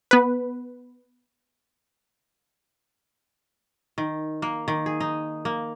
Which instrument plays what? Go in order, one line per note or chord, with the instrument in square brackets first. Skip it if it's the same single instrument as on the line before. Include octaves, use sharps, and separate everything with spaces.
[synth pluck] B3 B4
[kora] D#3
A#3
D#3
G#4
D#4
A#3